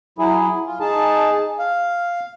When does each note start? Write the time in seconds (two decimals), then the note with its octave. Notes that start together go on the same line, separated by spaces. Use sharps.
0.18 F#3 E4 G#4
0.66 F4
0.80 D#4 G#4 A5
1.59 F5